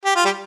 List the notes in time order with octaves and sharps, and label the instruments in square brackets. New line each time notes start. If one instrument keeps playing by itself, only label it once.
[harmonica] G4
F4
G3 G4